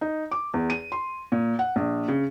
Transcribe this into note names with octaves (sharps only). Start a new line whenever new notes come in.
D#4
D6
E2
D#7
C6
A#2
F#5
A#1
C#3